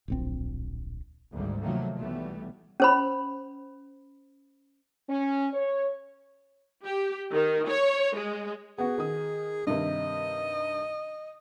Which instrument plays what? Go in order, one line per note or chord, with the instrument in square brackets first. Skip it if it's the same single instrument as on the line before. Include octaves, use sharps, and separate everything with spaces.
[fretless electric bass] D1 A#1 C4
[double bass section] G#1 D2 G#2 G3
C3 D#3 F3 F#3 A3 A#3
B1 E3 G3 A3 B3
[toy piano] C#4 C5 B5
[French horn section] C#4
C#5
[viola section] G4
D#3
C#5
G#3
[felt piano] B3 F#4 [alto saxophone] G#4
[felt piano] D#3 D#6
[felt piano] G2 C3 D#3 [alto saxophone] D#5